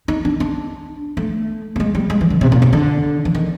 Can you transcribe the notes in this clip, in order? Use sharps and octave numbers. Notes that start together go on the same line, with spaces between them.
D#4
D4
D4
A3
A3
G#3
G3
G#3
E3
D3
C3
A#2
C3
D3
E3
D#3